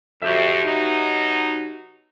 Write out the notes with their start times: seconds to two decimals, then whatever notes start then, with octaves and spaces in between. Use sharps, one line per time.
0.22 F2 F#4 G4 E5
0.65 B2 F#3 D#4